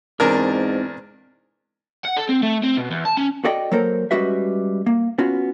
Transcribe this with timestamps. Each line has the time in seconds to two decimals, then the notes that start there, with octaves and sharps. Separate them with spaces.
0.20 E2 G#2 E3 C4 D4 A#4
2.05 F#5
2.16 A4
2.29 C4
2.42 A3
2.63 C4
2.77 B2
2.91 E2
3.05 A5
3.17 C#4
3.44 F#4 A4 D5 D#5 G5
3.71 F#3 A#3 A4 A#4 C5
4.11 G3 G#3 C#4 F#4 B4 E5
4.86 A#3
5.18 B3 C#4 F4 F#4